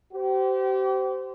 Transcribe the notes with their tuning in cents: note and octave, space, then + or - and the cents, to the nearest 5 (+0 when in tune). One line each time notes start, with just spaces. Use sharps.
G4 -35 C5 -20